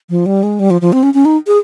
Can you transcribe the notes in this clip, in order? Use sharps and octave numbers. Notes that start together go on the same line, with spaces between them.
F3
G3
G#3
G3
F3
F3
C4
C#4
C#4
D#4
G#4